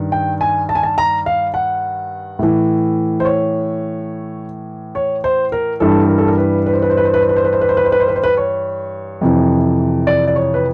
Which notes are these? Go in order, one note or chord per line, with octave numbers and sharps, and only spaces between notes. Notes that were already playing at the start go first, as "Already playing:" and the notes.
Already playing: G2 D#3
G5
G#5
A5
G#5
A5
A#5
F5
F#5
A2 E3
C5
C#5
C#5
C5
A#4
G2 E3 A4
A#4
A4
A#4
B4
B4
C5
B4
C5
B4
C5
B4
C5
B4
C5
B4
C5
B4
C5
B4
C5
B4
C5
B4
C5
B4
C#5
F2 C3 E3
D5
D5
C#5
B4